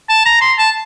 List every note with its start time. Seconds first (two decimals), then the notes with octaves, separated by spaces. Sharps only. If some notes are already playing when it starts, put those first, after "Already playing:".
0.09 A5
0.26 A#5
0.41 C6
0.58 A5